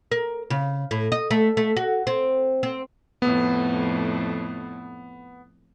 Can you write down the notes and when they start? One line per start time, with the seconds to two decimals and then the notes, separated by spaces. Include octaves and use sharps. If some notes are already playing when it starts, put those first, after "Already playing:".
0.11 A#4
0.50 C#3
0.91 A2
1.12 D#5
1.31 A3
1.57 A3
1.77 F#4
2.07 C4
2.63 C4
3.22 F2 A2 B3